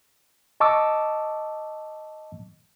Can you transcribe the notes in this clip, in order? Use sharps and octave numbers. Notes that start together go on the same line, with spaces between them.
D#5 A5 C#6 D6 E6